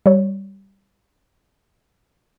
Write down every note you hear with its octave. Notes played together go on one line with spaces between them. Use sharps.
G3 C#5